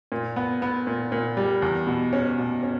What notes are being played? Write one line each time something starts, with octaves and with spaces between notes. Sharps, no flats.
A#2
B3
B3
A#2
A#2
G3
E2
B2
C#4
B2
C#4